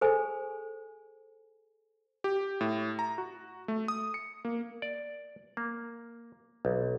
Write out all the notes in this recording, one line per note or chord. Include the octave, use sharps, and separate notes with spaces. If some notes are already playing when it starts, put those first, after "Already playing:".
G#4 A4 C5 G#5
G4
A2
A#5
F#4
A3
D#6
C#7
A#3
D5
A#3
B1